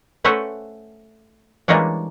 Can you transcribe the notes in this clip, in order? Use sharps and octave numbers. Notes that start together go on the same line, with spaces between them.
A3 C#4 B4 C5 E5 F#5
E3 G3 G#3 A#3 C#4 D4